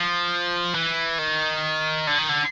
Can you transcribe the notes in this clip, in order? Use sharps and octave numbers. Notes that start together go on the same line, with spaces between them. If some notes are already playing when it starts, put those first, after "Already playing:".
Already playing: F3
E3
D#3
D3
D#3
D3